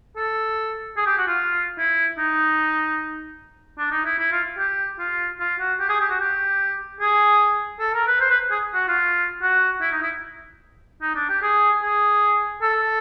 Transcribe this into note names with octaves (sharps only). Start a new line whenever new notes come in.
A4
G#4
G4
F#4
F4
E4
D#4
D4
D#4
E4
E4
F4
G4
F4
F4
F#4
G4
G#4
G4
F#4
G4
G#4
A4
A#4
B4
C5
B4
G#4
F#4
F4
F#4
E4
D#4
E4
D#4
D4
G4
G#4
G#4
A4